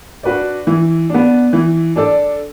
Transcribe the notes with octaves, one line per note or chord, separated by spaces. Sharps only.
D4 F#4 B4 D5
E3
B3 D4
E3
D4 A4 D5